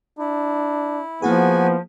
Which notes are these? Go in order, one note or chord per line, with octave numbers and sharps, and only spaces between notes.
D4 E4
F3 A#3 B3 E4 F#4 G#4 G#5